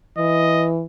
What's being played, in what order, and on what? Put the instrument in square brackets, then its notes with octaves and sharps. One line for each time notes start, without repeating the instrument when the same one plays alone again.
[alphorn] E3 [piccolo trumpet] D#5